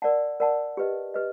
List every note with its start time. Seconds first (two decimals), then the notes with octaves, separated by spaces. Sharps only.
0.02 A#4 D5 F#5 A5
0.40 A#4 D5 F#5 A5
0.77 G4 B4 D#5
1.14 G4 B4 D#5